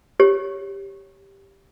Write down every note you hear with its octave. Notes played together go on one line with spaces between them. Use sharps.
G4 C#5